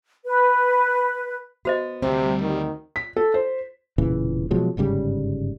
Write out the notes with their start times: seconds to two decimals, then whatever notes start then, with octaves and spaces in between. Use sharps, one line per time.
0.25 B4
1.65 B3 F#4 C5 D#5
2.02 D2 C3 G3 C4
2.41 D#3
2.96 B6
3.17 A4
3.34 C5
3.98 E1 A#2 C#3 E3
4.51 B2 F3 F#3 G#3
4.77 G1 G#2 C#3 G3